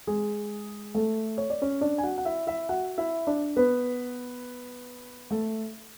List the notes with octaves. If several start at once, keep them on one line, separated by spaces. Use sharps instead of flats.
G#3 G#4
A3 A4
C#5
D5
C#4 C#5
D4 D5
G#5
F#4 F#5
F#5
E4 E5
E4 E5
F#4 F#5
E4 E5
D4 D5
B3 B4
A3 A4